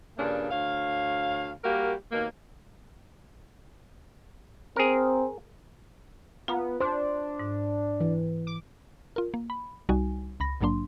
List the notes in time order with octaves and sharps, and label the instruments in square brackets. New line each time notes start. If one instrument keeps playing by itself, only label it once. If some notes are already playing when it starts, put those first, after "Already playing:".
[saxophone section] G2 A#2 C#3 A#3 D4
D2 C#5 F5
G3 A#3 F#4 G4 A#4
D#2 B2 A#3
[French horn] C4 [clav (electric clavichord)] G#4 A#4
[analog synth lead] B3 [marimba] F4 F5 A#5
[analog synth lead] D4 [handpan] C5
[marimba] G#2
[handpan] E3
[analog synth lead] D6
[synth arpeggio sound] F4 A#4
A#3
B5
C2 G3 D#4 F#4 G#5
C#2 B5 A#6
A#1 G#2 F#3 A#3 D4 C6